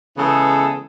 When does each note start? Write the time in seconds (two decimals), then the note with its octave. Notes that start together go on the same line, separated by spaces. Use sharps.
0.18 C#3 E3 G#3 B3 G#4 A4